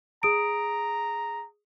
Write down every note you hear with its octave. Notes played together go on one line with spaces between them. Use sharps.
G#4 A#5 D#6 D7